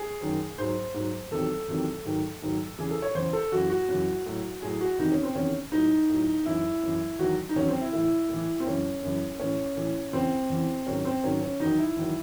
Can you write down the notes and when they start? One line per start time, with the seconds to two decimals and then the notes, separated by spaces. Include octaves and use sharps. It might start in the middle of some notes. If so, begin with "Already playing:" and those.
Already playing: G#4
0.21 F#2 D#3 F#3
0.58 G#2 F#3 C5
0.94 G#2 F#3
1.31 E2 C3 D#3 F#3 A4
1.68 E2 C3 D#3 F#3
2.05 G#2 D#3 F#3
2.42 G#2 D#3 F#3
2.78 E2 C#3 E3 G#4
2.91 A4
3.02 C#5
3.15 E2 C#3 E3 C5
3.33 A4
3.52 F#2 C#3 E3 F#4
3.70 F#4
3.89 F#2 C#3 E3 F#4
4.26 A2 F#3
4.62 A2 F#3 G#4
4.81 F#4
4.98 E2 C3 D#3 D#4
5.12 C#4
5.23 C4
5.35 E2 C3 D#3 C#4
5.72 A2 F#3 D#4
6.10 A2 F#3
6.46 F#2 E3 E4
6.83 F#2 E3
7.19 E2 D#3 F#3 F#4
7.49 D#4
7.56 E2 D#3 F#3 C#4
7.68 C4
7.81 E4
7.93 A2 E3 E4
8.29 A2
8.34 E3
8.60 C4
8.66 F#2 C#3 E3 C#4
9.02 F#2 C#3 E3
9.40 A2 E3 C#4
9.77 A2 E3
10.13 E2 C#3 E3 C4
10.50 E2 C#3 E3
10.87 G#2 D#3 F#3 C#4
11.05 C4
11.24 G#2 D#3 F#3 C#4
11.41 C#4
11.60 E2 D#3 F#3 D#4
11.79 E4
11.97 E2 D#3 F#3